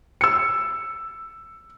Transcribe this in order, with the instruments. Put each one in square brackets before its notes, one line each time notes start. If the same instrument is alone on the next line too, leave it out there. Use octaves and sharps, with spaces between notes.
[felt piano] E6 C#7